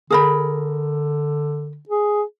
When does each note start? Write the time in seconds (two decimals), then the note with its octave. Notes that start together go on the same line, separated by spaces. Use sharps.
0.10 D3 G#4 A#4 B5
1.89 G#4